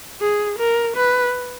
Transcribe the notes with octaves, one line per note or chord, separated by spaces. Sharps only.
G#4
A#4
B4